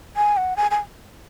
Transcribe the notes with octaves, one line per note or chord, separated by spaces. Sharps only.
G#5
F#5
G#5
G#5